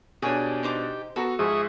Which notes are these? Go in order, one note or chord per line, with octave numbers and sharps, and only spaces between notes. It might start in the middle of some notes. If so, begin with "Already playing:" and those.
B2 D4 G4 G#4 C#5
D#4 C5 D6
B3 F#4 A4 A#5
G#2 F3 G#4 E5 G#5 C#6 D#6